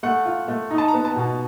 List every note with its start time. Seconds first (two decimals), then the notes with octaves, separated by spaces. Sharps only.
0.03 A3 F#5
0.25 F4
0.48 A3
0.71 D#4
0.78 A5
0.88 A#5
0.94 B3
1.05 A5
1.16 B2